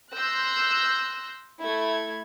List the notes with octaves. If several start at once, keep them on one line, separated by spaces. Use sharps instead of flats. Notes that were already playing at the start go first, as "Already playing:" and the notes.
C6 E6 F#6 G6 A#6
A3 E4 G#6